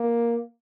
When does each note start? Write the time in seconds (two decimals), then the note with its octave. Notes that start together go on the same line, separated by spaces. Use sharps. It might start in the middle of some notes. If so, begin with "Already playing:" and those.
Already playing: A#3